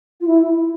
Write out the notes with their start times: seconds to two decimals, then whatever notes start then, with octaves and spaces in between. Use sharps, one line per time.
0.20 F4
0.26 E4